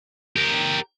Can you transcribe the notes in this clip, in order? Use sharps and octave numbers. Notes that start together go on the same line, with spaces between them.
G4 A#4